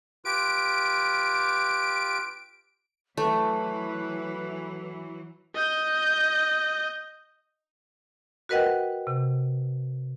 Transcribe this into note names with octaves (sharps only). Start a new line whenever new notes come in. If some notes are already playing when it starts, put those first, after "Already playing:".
F4 G4 B4 D7
E3 F#3 A3 B4
D#5 G6
F#4 A#4 B4 D#5 F#5 G5
C3